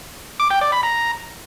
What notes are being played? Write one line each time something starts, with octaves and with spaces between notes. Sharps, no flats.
D6
G5
D5
B5
A#5